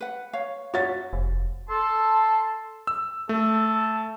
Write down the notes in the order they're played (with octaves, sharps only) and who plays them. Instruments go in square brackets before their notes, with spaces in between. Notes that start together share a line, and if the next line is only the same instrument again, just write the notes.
[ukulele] B4 F#5
C#5 F5
[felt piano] F#4 A6 [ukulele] C#5 E5
[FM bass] F1
[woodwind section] A4 A5 C6
[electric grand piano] E6
[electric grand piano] A3 [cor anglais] A4